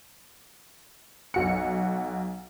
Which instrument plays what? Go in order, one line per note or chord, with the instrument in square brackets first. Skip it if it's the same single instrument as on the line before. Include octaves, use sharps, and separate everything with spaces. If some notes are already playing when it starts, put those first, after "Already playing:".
[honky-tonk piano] B1 F#4 C#7